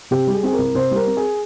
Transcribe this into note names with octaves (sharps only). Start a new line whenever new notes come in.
C3 G4
G3
G#4
C4 G#4
A#4
C2
C3 C5
G3 A#4
C4
G#4